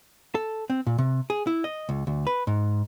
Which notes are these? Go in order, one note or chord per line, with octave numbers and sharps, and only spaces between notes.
A4
C4
A#2
C3
G#4
E4
D#5
C#2
D2
B4
G#2